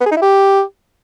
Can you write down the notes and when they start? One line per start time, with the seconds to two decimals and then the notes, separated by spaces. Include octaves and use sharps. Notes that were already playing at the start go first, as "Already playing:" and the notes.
0.01 B3
0.06 G#4
0.11 D#4
0.17 E4
0.22 G4